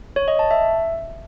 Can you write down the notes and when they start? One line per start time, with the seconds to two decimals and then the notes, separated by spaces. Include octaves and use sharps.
0.16 C#5
0.28 D#5
0.39 A5
0.51 E5